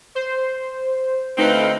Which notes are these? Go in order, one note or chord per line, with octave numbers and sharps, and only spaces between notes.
C5
D2 A3 C4 D#4 B4 F5